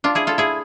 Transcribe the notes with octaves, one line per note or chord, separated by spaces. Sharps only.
D4 F4
E4 G#4
F4 A4
E4 G#4